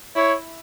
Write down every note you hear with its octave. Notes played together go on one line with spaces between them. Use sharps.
E4 C#5